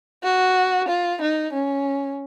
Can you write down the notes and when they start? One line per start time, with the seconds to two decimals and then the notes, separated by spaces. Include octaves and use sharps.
0.24 F#4
0.89 F4
1.22 D#4
1.53 C#4